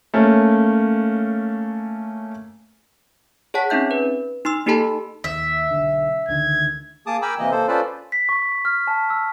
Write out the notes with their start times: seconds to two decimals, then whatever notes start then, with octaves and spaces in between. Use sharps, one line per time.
0.14 A3 A#3 C#4
3.54 G#4 C#5 F#5 A5 B6
3.70 C4 C#4 D#4 E5 G6
3.91 B4
4.45 D#4 C6 E6
4.66 A#3 D#4 G4 A4 A5 B5
5.24 D#2 E5
5.71 B1 D3
6.28 C#2 D3 D#3 G#6
7.07 A#3 G#4 A5 D6 D#6
7.22 A#4 G5 G#5 B5 D6 E6
7.39 C3 E3 A#3 D#5
7.51 A#3 A4 C5
7.68 C#4 F4 A4 B4 C5 D5
8.12 B6
8.29 C#6
8.65 F6
8.87 A5
9.10 E6